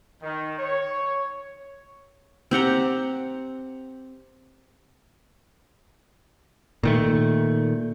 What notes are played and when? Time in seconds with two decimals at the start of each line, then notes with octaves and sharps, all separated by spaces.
0.22 D#3
0.59 C#5
2.51 C4 G4 F#5 A#5
6.83 A#2 D#3 A3